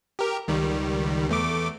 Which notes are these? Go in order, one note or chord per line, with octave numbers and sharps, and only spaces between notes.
G4 A#4
C#2 D#3 G3
E2 A3 D6